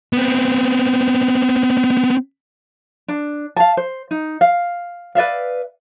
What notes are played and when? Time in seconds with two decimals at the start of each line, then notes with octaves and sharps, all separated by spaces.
0.13 B3 C4
3.08 D4
3.56 F5 A5
3.77 C5
4.11 D#4
4.41 F5
5.15 B4 D5 E5 F5